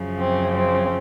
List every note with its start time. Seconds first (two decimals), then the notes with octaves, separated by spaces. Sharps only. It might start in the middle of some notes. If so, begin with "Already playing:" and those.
Already playing: F#2 C#3 F3
0.18 C4
0.54 C4